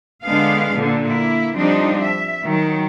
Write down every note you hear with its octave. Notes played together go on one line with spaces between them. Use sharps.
D3 G#3 B3 D4 F5
A#2 D3
A#3 E4
F3 G3 C4 D4 D#4
E5
D#3 F#3